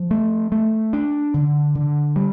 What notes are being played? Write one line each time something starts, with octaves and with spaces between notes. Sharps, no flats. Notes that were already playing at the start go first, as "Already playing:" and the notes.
Already playing: F3
A3
A3
D4
D3
D3
G3